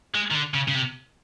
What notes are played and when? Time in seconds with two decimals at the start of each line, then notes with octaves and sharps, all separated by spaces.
0.15 G#3
0.31 D#3
0.35 D3
0.54 C#3
0.68 C#3
0.75 C3